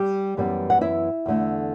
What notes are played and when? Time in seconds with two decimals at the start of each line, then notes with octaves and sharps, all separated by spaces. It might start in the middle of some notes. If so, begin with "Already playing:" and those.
Already playing: G3 G4
0.37 F#2 E3 G3 B3
0.70 F#5
0.81 E4 E5
1.26 E2 D3 A3